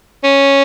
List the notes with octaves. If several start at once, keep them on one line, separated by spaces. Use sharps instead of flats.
C#4